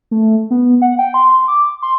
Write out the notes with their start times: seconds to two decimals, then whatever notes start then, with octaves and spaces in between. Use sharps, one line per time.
0.11 A3
0.51 B3
0.82 F#5
0.98 G5
1.14 C6
1.48 D6
1.82 C6